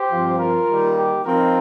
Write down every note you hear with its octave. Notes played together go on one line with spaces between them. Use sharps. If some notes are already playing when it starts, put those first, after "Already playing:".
Already playing: G4 C5
G2 F3 C4 F4
F4 A#4
D#3 G3 A#3 D#4
G4
F3 C4 D#4 F4 A#4